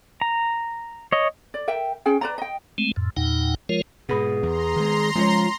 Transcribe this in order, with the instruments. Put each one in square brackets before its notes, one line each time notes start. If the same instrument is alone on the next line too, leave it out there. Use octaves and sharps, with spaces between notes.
[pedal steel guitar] A#5
C#5 D#5
[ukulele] D5
A#4 E5 G5
C#4 G#4 G5
B4 D5 A#5
D#5 G5
[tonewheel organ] G#3 A3 C4
F2 A2
E2 A#2 D#4 F#5 G5
F3 G#3 F4 A#4 C#5
[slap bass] G#2 B2 [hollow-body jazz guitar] B3 B5 [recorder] G#4
[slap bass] E2 [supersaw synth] A#5 C6
[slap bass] D#3 G#3
[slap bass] F3 [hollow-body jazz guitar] G#3 C#4 C#5 [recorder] F4